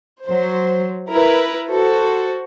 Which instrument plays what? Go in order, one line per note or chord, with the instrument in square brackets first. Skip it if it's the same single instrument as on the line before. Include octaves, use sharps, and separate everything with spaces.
[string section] F#3 C5
E4 A#4 B4
F#4 A4 C5